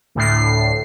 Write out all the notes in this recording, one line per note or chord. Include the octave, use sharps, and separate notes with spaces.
D2 A2 C7